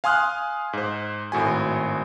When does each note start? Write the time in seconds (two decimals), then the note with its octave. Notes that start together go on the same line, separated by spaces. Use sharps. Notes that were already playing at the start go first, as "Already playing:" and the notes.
0.04 F5 G#5 C6 D#6 F6 F#6
0.73 G#2 C5
1.32 G#1 A2 F#4 G#5